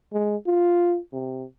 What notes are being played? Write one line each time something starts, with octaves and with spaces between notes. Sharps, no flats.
G#3
F4
C3